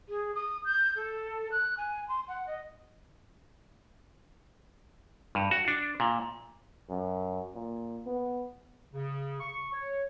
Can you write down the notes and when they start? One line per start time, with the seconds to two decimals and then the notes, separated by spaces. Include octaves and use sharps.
0.09 G#4
0.35 D#6
0.65 G6
0.96 A4
1.52 F#6
1.78 G#5
2.08 C6
2.28 F#5
2.47 D#5
5.35 G2
5.51 F#4
5.68 D4
6.00 A#2
6.90 F#2
7.55 A#2
8.06 B3
8.93 C#3
9.40 C#6
9.73 C#5